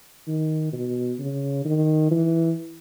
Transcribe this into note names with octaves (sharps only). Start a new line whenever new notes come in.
D#3
B2
C#3
D#3
E3